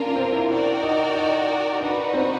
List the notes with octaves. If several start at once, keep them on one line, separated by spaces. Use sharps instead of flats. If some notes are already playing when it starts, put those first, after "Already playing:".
Already playing: A#3 C#4 D4 F4 A#4
C4
E4
F#4 A#4 D5 G5
D#4
D#4
D4 D#4 F#4 B4
C4